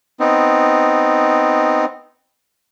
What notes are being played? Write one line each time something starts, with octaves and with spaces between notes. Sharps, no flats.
B3 C4 D#4